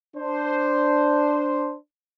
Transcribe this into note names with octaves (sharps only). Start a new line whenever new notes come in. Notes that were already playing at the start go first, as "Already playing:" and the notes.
D4 C5